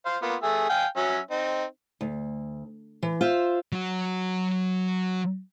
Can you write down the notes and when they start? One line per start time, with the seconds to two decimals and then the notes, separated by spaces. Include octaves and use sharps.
0.06 C5 F5
0.22 A#3 B3 F4
0.43 A3 G#4 E5
0.70 F5 G5 G#5
0.97 F#3 C#4 E5
1.31 C4 D#4
2.01 D2
3.03 E3
3.21 F4 C5 E5
3.72 F#3 F#4